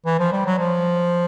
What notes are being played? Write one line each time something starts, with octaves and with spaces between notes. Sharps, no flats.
E3
F3
G3
F#3
F3